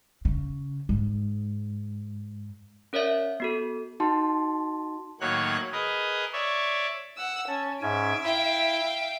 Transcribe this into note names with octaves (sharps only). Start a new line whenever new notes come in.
C#3
G#2
C#4 A#4 C#5 D5 E5
B3 F#4 A4
D#4 F#4 A5 C6
A2 D#3 F#3 A#3 C#5 F#6
G#4 A#4 B4 D#5
C#5 D5 E5
F#5 E6
C#4 A5
G#2 C#4 E5 G#5 D7
E4 F5 G5